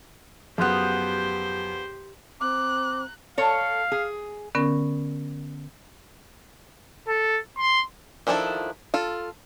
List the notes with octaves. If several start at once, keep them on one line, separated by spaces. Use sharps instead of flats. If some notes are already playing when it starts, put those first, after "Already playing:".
F#2 F3 B3 G4 G#4 C5 C6 F#6
C4 A#5 D6 F#6
A4 C#5 F5
G#4
D3 B3 C#4 A#4
A4
C6
D#3 F3 D4 E4 A4
F4 A4